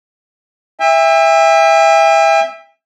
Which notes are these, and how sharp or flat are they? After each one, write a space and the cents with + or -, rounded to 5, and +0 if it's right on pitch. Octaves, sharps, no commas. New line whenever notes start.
E5 +0 G5 +45